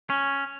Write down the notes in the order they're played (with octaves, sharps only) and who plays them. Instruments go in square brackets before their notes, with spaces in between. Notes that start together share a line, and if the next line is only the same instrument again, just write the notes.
[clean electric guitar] C#4